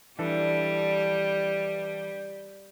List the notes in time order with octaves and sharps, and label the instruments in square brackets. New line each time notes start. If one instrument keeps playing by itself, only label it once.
[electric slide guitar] E3 D4 A4 [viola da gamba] G3